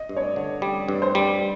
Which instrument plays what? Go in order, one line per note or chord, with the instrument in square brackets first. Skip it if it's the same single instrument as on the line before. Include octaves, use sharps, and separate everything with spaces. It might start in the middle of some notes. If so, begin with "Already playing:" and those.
Already playing: [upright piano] D#5
[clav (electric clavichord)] G2
[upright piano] C#5
D5
[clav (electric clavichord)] D3
[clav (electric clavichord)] G3 [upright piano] D5
[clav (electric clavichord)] G2
[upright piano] C5
[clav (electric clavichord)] G3